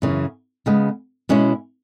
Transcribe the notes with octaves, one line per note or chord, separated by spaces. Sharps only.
F#2 C#3 E3
C#3 G#3 B3
B2 G#3 C#4 E4